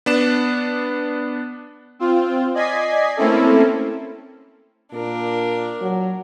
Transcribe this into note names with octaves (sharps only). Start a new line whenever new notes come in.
B3 D4 E7
C4 F4
D5 D#5 G#5 G#6 B6 C7
A3 A#3 C4 C#4 E4 A4
A#2 D4 A#4
F#3